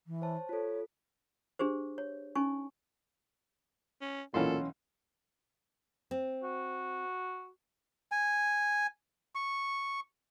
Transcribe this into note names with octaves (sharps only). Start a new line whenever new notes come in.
E3
C5 C#5 A5
F4 A4 C#5
D4 G4 G#4 C5
C#5
C#4 D#4 G#5 C#6
C#4
B1 A#2 E3 C#4 A4 F5 C6
C4
F#4
G#5
C#6